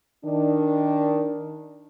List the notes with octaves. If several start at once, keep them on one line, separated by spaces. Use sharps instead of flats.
D#3 D4